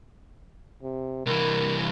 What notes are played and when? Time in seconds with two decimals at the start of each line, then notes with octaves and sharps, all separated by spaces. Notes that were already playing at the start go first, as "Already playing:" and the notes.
0.83 C3
1.26 C2 E3 A#4